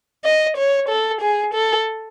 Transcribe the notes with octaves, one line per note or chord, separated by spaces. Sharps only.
D#5
C#5
A4
G#4
A4